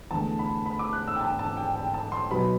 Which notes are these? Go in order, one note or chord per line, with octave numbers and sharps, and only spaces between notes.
E2 D3 A3 A5
B5
B5
D6
F#6
E6
G5
A5
A5
G5
G5
A5
C6
B1 B2 F#3 B3 B5